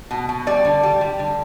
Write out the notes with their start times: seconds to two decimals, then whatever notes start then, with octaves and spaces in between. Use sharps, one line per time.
0.11 B2
0.29 B2
0.46 G3 D5
0.65 D3
0.83 G3
1.01 G3
1.19 D3